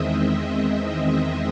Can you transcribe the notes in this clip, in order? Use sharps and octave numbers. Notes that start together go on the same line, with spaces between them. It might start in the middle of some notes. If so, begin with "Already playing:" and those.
Already playing: E2 D#3 G#3 C4 D#5 E5
E5
D#5